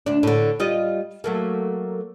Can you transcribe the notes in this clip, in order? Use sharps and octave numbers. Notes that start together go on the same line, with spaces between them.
D2 D4
A2 D3
G3 F4 D#5
F#3 A3 A#3